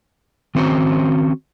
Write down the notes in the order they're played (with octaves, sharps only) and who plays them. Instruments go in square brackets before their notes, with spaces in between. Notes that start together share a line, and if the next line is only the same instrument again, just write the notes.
[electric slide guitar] D#3 C4 C#4 F#4 C5